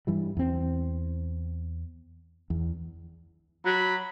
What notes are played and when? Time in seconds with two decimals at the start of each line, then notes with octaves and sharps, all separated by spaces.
0.07 G2 E3 G3
0.37 E2 C4
2.50 E2
3.65 F#3 B5